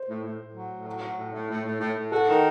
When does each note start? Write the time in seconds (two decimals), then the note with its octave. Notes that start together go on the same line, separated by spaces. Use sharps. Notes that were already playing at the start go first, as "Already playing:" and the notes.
Already playing: C5
0.08 A2
0.24 A2
0.40 A2
0.55 F#3
0.70 A2
0.86 F#3
1.01 F#3
1.17 A2
1.33 A2
1.49 A2
1.64 A2
1.80 A2
1.96 A2
2.12 F#4 A4
2.27 D#3